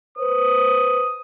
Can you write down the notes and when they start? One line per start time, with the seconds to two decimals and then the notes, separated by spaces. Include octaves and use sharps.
0.18 B4 C5 D#6